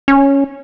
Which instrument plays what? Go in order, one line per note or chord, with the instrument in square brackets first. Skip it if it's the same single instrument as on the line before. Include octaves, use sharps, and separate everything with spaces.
[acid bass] C#4